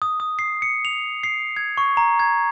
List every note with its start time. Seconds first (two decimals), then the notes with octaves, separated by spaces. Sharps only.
0.02 D#6
0.20 D#6
0.39 C7
0.62 C#7
0.85 F7
1.24 C7
1.57 G#6
1.78 C#6
1.97 A#5
2.19 G#6